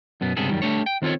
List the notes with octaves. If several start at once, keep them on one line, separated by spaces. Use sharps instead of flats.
F#2 B2 B3
C#2 G2 C3 B3 G#4 A4
F#2 D#3 G3
G3 A3 D4 C#5
G5
D#3 C4 F4 A4 C#5